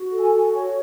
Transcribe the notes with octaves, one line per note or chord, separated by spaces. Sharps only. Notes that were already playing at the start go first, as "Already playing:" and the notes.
Already playing: F#4
A4
G#5
F#4
C#5